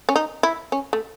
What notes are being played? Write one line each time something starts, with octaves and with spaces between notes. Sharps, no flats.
C#4
D#4
E4
C#4
A3